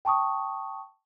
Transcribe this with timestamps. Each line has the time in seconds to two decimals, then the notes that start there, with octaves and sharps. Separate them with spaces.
0.05 G5 A5 C#6 D#6